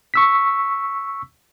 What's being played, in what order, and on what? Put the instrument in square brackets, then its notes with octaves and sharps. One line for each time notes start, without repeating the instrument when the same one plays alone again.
[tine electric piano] C#6 E6 B6